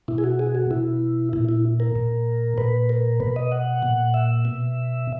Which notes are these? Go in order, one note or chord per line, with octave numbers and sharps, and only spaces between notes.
B2 E4
G#4
F#4
G#4
F#4
B2 E4
A#2 E4
E4
A#4
A#2
A#2 B4
A#4
B2 B4
D#5
F#5
A#2
E5
B2